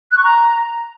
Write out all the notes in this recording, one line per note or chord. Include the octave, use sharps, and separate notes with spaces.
F#6
C#6
A#5